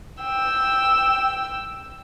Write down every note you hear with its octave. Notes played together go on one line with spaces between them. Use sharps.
G5 E6